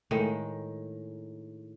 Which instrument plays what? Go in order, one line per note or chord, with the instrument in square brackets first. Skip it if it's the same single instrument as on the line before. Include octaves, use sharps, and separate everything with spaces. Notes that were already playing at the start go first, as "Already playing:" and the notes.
[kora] A2 D#3 G#3